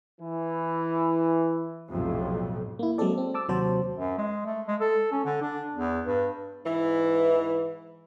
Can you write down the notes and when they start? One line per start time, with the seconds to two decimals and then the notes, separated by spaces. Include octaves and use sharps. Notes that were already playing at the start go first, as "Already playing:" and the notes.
0.21 E3
1.90 B1 F2 A2 C3 F4
2.79 A#3 E4
2.98 F#3 G#3 A#3 C4 A4 D5
3.18 C4
3.34 A5 D6 E6
3.48 D#2 C3 F#3 F#4 C5 A5
3.98 F#2
4.18 G#3
4.45 A3
4.67 G#3
4.80 A4
5.12 C#4
5.25 D3
5.41 D4
5.74 E2
6.06 G2
6.63 G#2 E3